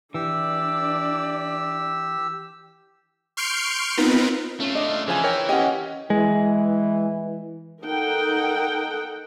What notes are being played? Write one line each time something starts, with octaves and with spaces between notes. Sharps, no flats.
E3 D4 G4 D5 E6
C6 C#6 F6 G6 C7 D7
B3 C4 D#4 F4 A#4 B4
A3 C#4 F4
D4 D5 D#5
C#3 E3 F3 C5 G#5
A#4 C#5 G5
C#4 G4 D#5 F#5
E3 G#3
D#4 A4 A#4 F#5 G5